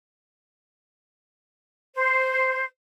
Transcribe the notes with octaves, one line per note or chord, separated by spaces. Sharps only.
C5